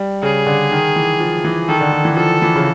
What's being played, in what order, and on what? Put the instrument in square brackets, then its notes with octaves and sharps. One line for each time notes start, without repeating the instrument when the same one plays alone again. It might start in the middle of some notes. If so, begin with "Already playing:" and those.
Already playing: [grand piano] G3
[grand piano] C#3 [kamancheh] G#4
[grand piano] D3
D#3
E3
F3
E3
[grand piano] D#3 [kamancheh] A4
[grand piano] D3
D#3
E3
[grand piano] F3 [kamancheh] A4
[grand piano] E3
C#3